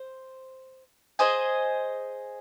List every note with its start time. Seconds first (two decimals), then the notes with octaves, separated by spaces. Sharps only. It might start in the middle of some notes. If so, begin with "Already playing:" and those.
Already playing: C5
1.19 G#4 C5 D#5 G#5